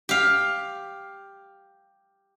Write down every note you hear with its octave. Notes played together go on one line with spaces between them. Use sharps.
G4 F5